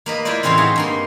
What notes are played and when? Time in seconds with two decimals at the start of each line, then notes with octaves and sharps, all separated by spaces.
0.06 A#3 B4 D#5
0.25 E4 F4 A#4 C5 D5
0.43 A2 C#3 E3 C4 F5 C6
0.57 D#4 F#4 G#4 C6
0.76 G2 A#3 C6